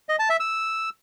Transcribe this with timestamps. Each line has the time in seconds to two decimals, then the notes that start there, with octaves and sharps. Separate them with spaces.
0.09 D#5
0.19 A5
0.29 E5
0.40 E6